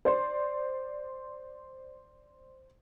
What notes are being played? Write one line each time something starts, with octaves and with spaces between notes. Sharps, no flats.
C5 D5 C6